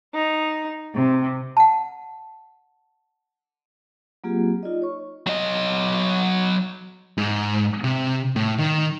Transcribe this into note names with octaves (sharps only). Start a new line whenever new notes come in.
D#4
C3
F#5 A5
F#3 A#3 C4 F4 G4 G#4
D#4 F4 D5 D#5
C#5 C#6
F#3 D#5
G#2
C3
A2
D#3